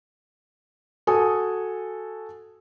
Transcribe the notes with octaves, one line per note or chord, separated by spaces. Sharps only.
F#4 A4 G#5 D#6